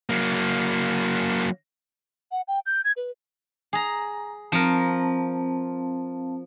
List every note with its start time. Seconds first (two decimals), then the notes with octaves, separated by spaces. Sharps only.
0.10 F#3 A#3
2.32 F#5
2.48 G5
2.66 G6
2.84 G#6
2.97 B4
3.73 G#4 A#5
4.52 F3 C4 A#4 F5 A5